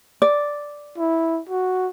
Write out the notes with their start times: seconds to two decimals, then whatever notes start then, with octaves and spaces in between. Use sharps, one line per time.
0.22 D5
0.98 E4
1.49 F#4